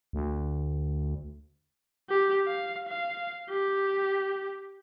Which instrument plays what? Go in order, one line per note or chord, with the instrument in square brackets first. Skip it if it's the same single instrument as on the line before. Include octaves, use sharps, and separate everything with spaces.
[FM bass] D2
[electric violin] G4
F5
F5
G4